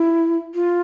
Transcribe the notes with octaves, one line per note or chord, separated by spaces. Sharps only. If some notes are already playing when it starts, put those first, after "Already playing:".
Already playing: E4
F4